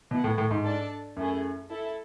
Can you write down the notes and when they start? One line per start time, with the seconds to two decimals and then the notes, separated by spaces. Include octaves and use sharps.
0.11 B2 E4 B4 F#5
0.24 A2
0.38 A2
0.51 G#2
0.63 D4 A4 D5 A5
1.17 F#2 A3 E4 G#4
1.69 E4 A4 E5 A5